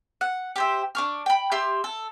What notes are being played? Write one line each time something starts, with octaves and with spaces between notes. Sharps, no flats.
F#5
G4 C5 E5
D4 C#6 F6
G5 B5
G4 E5 C6
A4